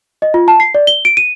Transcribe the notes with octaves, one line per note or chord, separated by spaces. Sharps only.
D#5
F4
A5
C7
D5
G7
D7
D#7